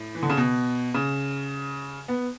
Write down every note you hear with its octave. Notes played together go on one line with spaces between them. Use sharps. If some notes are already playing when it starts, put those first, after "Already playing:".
Already playing: A2
E3
D3
C#3
B2
C#3
B3